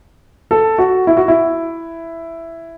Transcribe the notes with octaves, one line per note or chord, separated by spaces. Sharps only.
A4
F#4
E4
F#4
E4